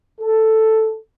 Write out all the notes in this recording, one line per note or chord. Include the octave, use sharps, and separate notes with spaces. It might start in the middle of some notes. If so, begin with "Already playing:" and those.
A4